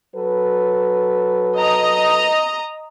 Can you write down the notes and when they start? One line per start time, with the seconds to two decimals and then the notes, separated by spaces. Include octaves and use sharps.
0.16 F#3 A4 B4
1.58 D#5 A#5